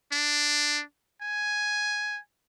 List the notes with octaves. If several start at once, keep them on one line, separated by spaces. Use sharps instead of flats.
D4
G#5